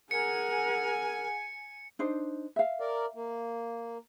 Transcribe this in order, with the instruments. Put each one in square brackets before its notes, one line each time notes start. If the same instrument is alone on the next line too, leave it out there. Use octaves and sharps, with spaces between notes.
[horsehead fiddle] G#4 F#5 [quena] A#4 [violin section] G#5 [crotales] C#7
[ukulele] D4 D#4 C5
E5 F5
[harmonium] A#4 D5
A#3